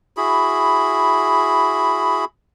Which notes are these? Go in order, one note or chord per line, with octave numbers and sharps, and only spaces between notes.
E4 F#4 G#4 B5